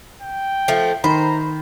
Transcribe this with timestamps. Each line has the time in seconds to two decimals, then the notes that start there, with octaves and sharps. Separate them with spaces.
0.22 G5
0.68 F3 A3
1.04 D#3 C5 A#5 B5